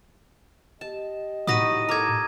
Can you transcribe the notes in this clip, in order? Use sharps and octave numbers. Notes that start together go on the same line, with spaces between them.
G4 D#5 A5
A2 D#4 F#4 B4 D#6 A#6 D#7
A4 A#4 A#5 D6 G#6